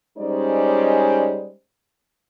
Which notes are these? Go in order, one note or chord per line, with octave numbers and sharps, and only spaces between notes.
G3 G#3 C#4 D#4 C5 D5